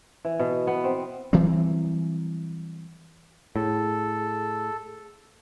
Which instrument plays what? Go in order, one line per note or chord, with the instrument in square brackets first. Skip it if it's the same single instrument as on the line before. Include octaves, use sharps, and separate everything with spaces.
[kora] E3
B2
B3
C4
[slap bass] E3 F#3 G3 C4
[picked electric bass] A2 [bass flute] G#4 [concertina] A4